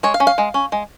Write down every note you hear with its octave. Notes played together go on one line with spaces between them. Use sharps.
G#3 C#5
F5
C#4
F5
G#3
C#4
G#3